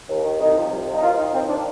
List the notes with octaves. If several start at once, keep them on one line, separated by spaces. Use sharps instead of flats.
D#2
D#3
C2 D#4
C3 F3
C2
C3 F3
D#4
D#2 F4
D#3 D#4
D#2 C4
D#3 D4